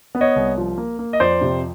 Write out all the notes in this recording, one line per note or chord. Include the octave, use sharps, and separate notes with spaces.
B3
C#5 D#5
C2
F3
A#3
A#3
D#5
F2 C5 D5
C3